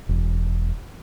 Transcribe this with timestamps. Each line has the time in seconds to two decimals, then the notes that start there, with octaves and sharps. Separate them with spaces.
0.09 E1